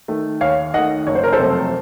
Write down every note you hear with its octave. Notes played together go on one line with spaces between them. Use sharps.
D#3 A3
D#2 C#5 F5
D#3 A3 D#5 F#5
F#1 C#5
C5
A#4
A4 C5
F2 C3 F#3 A3